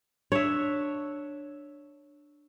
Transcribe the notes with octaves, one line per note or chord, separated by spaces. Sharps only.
D4 C#5 E5